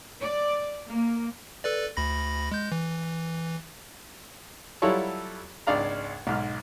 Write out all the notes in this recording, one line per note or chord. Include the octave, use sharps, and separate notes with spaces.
D5
A#3
A4 B4 D5
D2 B5 A#6
G#3 G6
E3
F#3 G3 E4 F4 A4 C#5
G#1 C#2 D4 D5 F5 A#5
B1 G#2 F6